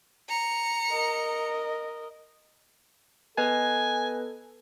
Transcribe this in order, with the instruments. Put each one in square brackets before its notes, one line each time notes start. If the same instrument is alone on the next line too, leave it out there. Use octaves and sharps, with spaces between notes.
[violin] A#5 C#7
[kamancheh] A#4 D#5
[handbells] B3 B4 D#5 [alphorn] A4 [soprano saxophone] G#5